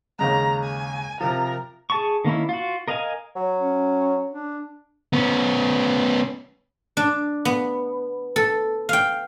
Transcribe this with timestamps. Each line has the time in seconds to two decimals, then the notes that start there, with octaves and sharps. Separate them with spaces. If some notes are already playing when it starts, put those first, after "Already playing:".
0.19 D#2 C#3 G#3 A#5
0.63 G#5
1.21 C3 F3 A#4
1.90 G#4 A5 C#6
2.25 D#3 A#3 C#4 E4
2.49 F4 F#4
2.88 A#4 D#5 F5 F#5 G#5
3.36 F#3
3.59 C#4
4.31 D4
5.13 B3 C#4
6.97 D4
7.45 B3
8.36 A4
8.89 F5 G5